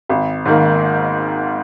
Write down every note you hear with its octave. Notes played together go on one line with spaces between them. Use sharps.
G#1
G#2 D#3 A#3